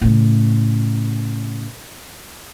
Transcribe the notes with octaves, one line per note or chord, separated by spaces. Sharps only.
A2 C#3